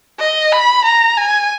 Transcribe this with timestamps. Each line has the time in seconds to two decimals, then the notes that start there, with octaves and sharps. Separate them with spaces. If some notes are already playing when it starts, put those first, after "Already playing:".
0.19 D#5
0.52 B5
0.85 A#5
1.18 G#5